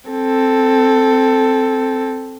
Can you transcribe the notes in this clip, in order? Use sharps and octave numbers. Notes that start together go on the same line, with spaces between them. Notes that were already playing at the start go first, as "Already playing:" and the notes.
C4 A4